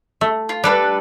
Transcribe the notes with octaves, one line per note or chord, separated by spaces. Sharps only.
A3
F4
G3 D4 A4 B4